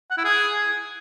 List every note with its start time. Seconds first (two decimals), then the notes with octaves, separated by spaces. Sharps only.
0.11 F#5
0.18 E4
0.25 G#4